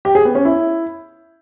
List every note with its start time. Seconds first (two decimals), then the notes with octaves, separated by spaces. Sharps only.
0.05 G4
0.15 G#4
0.25 B3
0.35 C#4
0.45 E4